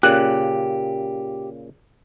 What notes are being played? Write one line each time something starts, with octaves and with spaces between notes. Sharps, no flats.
A#2 C#3 G4 F#6